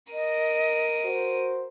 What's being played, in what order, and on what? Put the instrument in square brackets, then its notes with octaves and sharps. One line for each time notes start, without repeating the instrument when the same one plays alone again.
[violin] A#4 D#7 [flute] D#5
[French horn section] F#4 C5